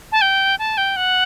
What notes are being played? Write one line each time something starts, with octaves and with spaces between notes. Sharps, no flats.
A5
G5
A5
G5
F#5